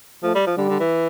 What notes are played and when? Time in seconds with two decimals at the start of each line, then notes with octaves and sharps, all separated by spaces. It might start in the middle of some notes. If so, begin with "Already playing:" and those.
0.23 F3 A3
0.35 G3
0.46 F3
0.57 D3 G3
0.69 D3
0.80 E3